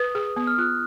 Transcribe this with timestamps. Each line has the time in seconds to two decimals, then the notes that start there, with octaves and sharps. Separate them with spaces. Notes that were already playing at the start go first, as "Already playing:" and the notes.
Already playing: B4 D#6
0.15 G#4
0.36 B3 D#6
0.47 F6
0.58 F4 F#6